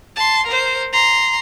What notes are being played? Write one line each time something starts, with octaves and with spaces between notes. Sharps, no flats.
A5 C6
A#4 C5
A#5 C6